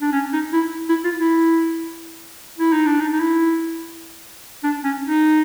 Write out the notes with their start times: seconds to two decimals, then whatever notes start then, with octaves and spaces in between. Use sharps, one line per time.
0.01 D4
0.12 C#4
0.33 D#4
0.53 E4
0.89 E4
1.04 F4
1.20 E4
2.59 E4
2.72 D#4
2.86 D4
3.00 D#4
3.13 D#4
3.20 E4
4.63 D4
4.84 C#4
5.04 D#4